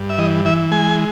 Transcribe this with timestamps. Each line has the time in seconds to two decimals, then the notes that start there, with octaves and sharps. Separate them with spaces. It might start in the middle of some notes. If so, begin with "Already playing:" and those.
Already playing: G2
0.10 E5
0.18 E3 D#5
0.45 E3 E5
0.71 G#3 G#5